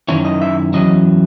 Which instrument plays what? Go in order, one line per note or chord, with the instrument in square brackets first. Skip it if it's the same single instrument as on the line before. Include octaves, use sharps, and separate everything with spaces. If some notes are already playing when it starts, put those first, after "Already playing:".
[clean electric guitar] F#2 D#3 F#3 C#4 E4 C#5
D#5
E5
E2 B2 F#3 C#4 E4 D#5